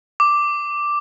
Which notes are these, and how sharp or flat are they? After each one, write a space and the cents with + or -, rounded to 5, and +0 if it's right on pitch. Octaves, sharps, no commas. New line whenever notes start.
D6 +0